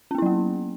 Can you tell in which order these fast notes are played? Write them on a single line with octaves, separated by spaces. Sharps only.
C#4 B3 E4 F#3 A#3